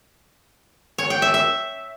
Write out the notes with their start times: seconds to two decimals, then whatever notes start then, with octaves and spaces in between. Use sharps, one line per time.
0.98 C#5
1.10 G5
1.22 E5
1.34 E5